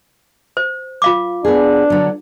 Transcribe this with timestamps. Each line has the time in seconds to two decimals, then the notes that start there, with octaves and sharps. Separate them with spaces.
0.57 C5
1.02 F4 F5 D6
1.45 B3 D4 G#4
1.90 D3 F#3